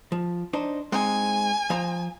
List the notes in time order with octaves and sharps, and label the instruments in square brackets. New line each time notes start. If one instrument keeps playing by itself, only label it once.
[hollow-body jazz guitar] F3
D4 D#4 C5
[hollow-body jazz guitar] G#3 C4 D#4 [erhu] G#5
[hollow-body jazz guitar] F3 C5 A#5